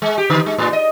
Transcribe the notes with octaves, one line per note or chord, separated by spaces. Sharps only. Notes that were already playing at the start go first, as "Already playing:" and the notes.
G#3
G4
D3
G#3
A2
D#5